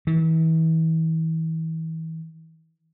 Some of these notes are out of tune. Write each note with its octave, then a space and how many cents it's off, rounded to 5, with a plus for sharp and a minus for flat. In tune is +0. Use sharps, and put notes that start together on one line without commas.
E3 -35